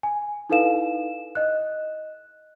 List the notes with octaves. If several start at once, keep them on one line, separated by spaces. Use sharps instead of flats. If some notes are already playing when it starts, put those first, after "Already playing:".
G#5
D#4 E4 A4 B4 F5 E7
D#5 F#6